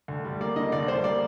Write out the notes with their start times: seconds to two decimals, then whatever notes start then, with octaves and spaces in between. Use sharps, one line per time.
0.08 D2
0.24 G3
0.41 A#3 D5
0.56 D3 D#5
0.72 D2 D5
0.88 G3 C5
1.04 A#3 D5